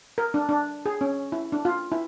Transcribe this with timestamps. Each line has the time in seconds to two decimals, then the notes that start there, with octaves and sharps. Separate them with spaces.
0.18 A#4
0.34 D4
0.49 D4
0.86 G#4
1.01 C#4
1.32 E4
1.52 D4
1.65 F4
1.92 E4